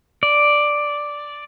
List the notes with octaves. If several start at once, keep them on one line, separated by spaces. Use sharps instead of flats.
D5